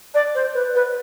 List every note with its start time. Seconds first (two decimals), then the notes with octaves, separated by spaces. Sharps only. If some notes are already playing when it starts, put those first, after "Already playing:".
0.14 D5
0.34 C5
0.54 B4
0.74 B4